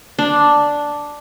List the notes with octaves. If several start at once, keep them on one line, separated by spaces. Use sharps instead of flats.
D4